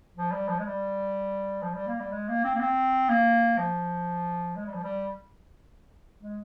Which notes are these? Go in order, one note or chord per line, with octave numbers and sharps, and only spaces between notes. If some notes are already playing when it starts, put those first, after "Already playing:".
F3
G3
F3
G#3
G3
F3
G3
A#3
G3
G#3
A#3
C4
A#3
C4
A#3
F3
G#3
G3
F3
G3
G#3